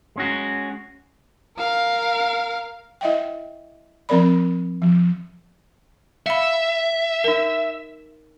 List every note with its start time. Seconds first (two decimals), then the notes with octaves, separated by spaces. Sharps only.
0.16 G#3 C#4 F#4
1.57 A#4 F5
3.01 E4 D#5 E5 F#5 G5
4.09 F3 C4 A#4 D5 B5
4.82 F3
6.26 E5 F5 B5
7.24 D#4 A#4